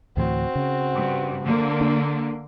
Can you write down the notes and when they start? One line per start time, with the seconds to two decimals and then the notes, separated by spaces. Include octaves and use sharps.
0.17 D2 A2 E3 C4 F#4
0.55 C#3
0.93 G2
1.43 D3 A#3
1.81 D4